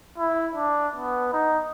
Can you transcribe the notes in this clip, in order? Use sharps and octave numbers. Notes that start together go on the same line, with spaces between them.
E4
D4
B3
D#4